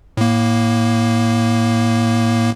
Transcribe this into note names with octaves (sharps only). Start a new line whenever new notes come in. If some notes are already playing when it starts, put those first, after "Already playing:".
A2 A#3